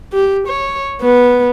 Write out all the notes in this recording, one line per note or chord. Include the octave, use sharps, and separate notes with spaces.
G4
C#5
B3